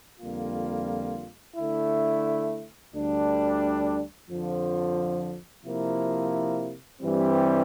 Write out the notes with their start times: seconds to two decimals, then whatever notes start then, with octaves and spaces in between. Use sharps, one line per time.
0.21 F2 D3 G3 A#3 F4
1.57 D3 A3 E4
2.93 D2 D3 G3 D4
4.29 F2 D3 F3
5.65 C3 F3 A#3 E4
7.02 G2 E3 G3 C4